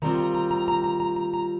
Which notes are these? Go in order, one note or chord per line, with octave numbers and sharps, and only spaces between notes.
D#3 G3 C4 F4 A#5
A#5
A#5
A#5
A#5
A#5
A#5
A#5
A#5